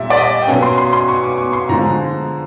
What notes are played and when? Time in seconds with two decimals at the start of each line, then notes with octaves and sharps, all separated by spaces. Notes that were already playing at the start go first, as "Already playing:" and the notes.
Already playing: A#2 G3 E5
0.10 D5
0.17 D#5
0.42 G5
0.48 B2 F#3 A#3 C#4 G#5
0.62 C6
0.78 C6
0.93 C6
1.08 C#6
1.24 D6
1.38 C#6
1.53 C6
1.69 D3 F3 G#3 A#5